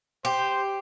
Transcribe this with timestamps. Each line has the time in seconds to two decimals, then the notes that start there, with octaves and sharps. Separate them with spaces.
0.25 G4 C5